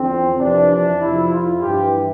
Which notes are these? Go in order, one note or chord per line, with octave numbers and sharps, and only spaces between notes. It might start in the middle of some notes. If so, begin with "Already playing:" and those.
Already playing: E2 D3 F3 C4
F2 C3 E3 D4
D4
F2 C3 F3 E4
F4
G2 E3 G4